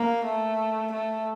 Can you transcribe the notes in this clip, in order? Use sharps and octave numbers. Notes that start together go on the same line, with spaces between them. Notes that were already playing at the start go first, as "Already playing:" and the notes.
Already playing: A#3
A3
A3